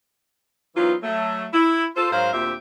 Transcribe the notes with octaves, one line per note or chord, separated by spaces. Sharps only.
E3 F#3 B3 C4 D#4 F4
F#3 A3
E4
F4 A4 C5
G#2 F#3 A#4 C5 F5
D2 A#2 C4 G4 E5